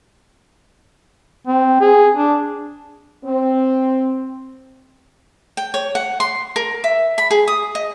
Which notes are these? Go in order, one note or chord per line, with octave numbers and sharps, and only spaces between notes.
C4
G#4
D4
C4
G5
C#5
F#5
C6
A#4
E5
B5
G#4
D#6
D#5